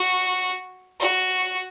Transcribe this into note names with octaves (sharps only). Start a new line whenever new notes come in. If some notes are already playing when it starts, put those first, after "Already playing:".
Already playing: F#4
F#4